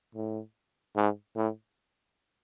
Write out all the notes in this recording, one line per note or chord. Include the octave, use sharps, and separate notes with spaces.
A2
G#2
A2